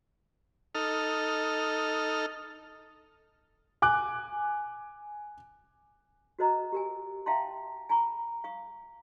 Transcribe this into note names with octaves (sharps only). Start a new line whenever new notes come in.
D#4 A4 F6
G#5 D6 F#6
F#4 A#4 C5 D#5 A#5
G4 A#4 G#5
E5 F5 G5 A5 A#5 C6
G#5 A#5 B5 C#6
F5 C#6 D#6